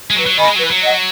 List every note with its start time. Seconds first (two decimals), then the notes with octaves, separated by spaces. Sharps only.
0.10 G#3
0.16 F#3 B4
0.26 F#3
0.38 D#3 D#5 G#5 B5
0.48 G#3
0.56 F#3
0.59 E3 B4
0.70 F#3
0.82 D#5 F#5